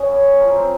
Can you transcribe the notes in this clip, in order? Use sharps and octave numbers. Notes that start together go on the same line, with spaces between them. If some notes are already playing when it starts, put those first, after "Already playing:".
Already playing: C#3 F#4 G#4
F#2
F3 A#4
C4